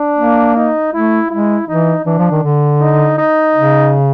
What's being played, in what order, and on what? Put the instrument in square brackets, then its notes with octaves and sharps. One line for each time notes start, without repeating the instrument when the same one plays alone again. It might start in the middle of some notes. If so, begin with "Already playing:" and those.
Already playing: [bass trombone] D4
[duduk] A#3
[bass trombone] D#4
[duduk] A3 [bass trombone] E4
[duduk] G#3 [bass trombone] E4
[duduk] E3 [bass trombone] D#4
[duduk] E3 [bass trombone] D4
[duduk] F3
D#3
D3
[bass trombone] D#4
D#4
[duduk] C#3